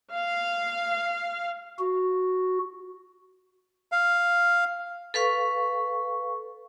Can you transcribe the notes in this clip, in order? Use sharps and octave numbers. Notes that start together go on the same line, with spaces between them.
F5
F#4
F5
A4 B4 F5 C#6